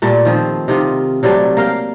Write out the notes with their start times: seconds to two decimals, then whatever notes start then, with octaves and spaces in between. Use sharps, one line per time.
0.02 A#2 G3 A3
0.25 D#3 F3 C4
0.68 C3 D#3 F4
1.23 C3 F#3 G3 A3
1.57 A#3 F5 G5